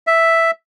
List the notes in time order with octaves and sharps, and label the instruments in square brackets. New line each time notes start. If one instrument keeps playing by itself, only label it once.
[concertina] E5